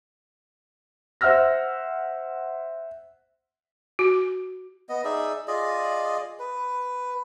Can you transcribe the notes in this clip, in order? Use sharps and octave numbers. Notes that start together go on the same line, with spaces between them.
C5 E5 F#5 E6 F6 A#6
F#4
B3 D#5
D#4 G#4 D5 E5
F4 G#4 D5 D#5
B4